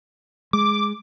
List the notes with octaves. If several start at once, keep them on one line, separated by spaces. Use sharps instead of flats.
G#3 D6